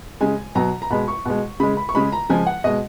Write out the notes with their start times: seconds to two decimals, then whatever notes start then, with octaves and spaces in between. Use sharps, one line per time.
0.21 C#3 G#3 G#5
0.55 B2 F#3 A#5
0.82 A#5
0.90 B2 G#3 B5
1.08 C#6
1.25 B2 G#3
1.60 C#3 G#3 B5
1.77 B5
1.89 C#6
1.95 C#3 G#3 B5
2.12 A#5
2.29 C#3 F3 G#3 G#5
2.47 F#5
2.64 B2 G#3 D#5